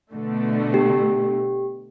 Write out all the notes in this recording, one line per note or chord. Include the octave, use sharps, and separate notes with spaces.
B2 D3 A3
G4